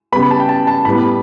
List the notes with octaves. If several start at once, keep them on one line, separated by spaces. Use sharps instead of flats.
C#3 G3 B3 B5
A5
G5
A5
A5
A2 G3 B3 B5